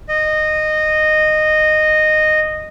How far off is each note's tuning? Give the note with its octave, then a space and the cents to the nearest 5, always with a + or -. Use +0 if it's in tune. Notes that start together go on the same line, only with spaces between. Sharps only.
D#5 -15